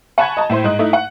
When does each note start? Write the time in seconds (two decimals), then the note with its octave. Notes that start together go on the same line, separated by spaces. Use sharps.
0.18 F#5 G#5 A5 B5 C#6 G#6
0.37 D#5 A5 A#5
0.49 A2 E4 C5 C6
0.64 G#2 D#5 F#6
0.79 A3 D#4 E4
0.93 F#5